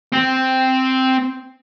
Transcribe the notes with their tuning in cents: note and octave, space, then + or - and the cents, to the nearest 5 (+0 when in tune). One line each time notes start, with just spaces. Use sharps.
C4 +0